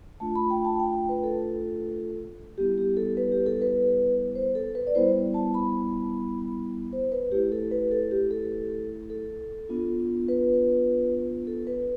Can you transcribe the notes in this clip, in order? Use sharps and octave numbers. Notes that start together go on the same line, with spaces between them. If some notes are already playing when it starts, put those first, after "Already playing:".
A3 D4 F4 A5
B5
G5
A5
G5
G5
B4
A4
G3 B3 E4 G4
G4
A4
B4
G4
A4
B4
C5
A4
B4
D5
G3 B3 E4 C5
A5
B5
C5
B4
A3 E4 G4
A4
B4
A4
G4
A4
A4
B3 D4 F4
B4
A4
B4